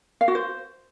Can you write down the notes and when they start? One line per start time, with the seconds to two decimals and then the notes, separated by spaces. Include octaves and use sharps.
0.21 F5
0.28 F#4
0.35 C5